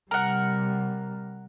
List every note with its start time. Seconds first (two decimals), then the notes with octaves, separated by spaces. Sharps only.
0.11 C3 G3 A#4 F#5